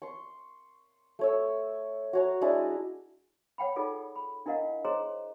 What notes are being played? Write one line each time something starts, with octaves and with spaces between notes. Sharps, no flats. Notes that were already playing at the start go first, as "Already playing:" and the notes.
C6 C#6
A3 C#5 E6
F#4 C#5 A#5
G#3 D4 E4 D#5
C#5 F#5 G5 B5
D#4 F4 G#4 A4 C#5 D5
B5
D4 E4 A#4 D#5 F5 F#5
G#4 C5 C#5 D#5 A#5 C6